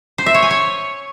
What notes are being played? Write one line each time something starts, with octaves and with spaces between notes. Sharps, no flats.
C5
E5
C#5
G#5
C#5